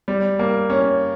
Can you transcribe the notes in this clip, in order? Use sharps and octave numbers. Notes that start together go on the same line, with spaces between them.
G3
A#3
C#4